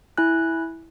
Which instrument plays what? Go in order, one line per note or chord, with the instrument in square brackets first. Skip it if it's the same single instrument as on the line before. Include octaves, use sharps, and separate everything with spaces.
[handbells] E4 G#5 F#6